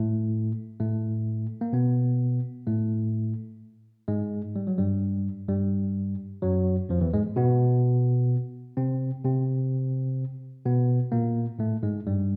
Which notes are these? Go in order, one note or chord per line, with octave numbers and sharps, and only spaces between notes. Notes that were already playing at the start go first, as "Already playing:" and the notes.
Already playing: A2 A3
A2 A3
A#3
B2 B3
A2 A3
G#2 G#3
G3
F#3
G2 G3
G2 G3
F#2 F#3
F2 F3
E2 E3
G#2 G#3
B2 B3
C3 C4
C3 C4
B2 B3
A#2 A#3
A2 A3
G#2 G#3
G2 G3